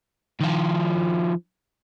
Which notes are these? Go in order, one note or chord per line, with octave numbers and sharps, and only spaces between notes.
D#3 F3